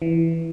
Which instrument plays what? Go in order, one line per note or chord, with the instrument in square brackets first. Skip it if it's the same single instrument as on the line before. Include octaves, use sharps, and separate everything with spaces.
[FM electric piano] E3